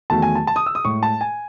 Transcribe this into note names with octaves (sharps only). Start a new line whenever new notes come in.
E2 D#3 F#3 A3 A5
G#5
A5
A5
D#6
E6
D#6
A2 G#3 C#6
A5
G#5